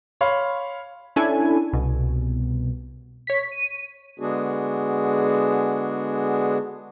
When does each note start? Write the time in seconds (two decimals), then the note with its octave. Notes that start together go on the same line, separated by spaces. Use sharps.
0.21 C#5 F5 B5 C6
1.16 C#4 D4 E4 A4 G#5
1.73 C2 B2
3.27 C#5 B6
3.51 D#7
4.19 D3 G#3 B3 D4 F#4 G#4